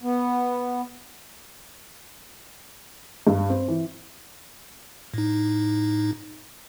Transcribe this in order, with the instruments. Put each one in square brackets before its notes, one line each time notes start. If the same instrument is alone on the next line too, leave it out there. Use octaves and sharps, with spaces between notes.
[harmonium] B3
[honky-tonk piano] G2
C4
E3
[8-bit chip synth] A2 D#4